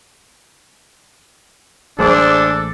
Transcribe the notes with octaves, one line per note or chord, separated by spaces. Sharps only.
A1 G3 A#3 D4 G#4 A4 C5 D6